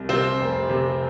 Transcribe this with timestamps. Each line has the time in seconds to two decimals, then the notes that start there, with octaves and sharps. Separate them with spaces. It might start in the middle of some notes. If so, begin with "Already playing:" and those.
Already playing: C2
0.09 C3 C4 C5
0.39 F1
0.69 C3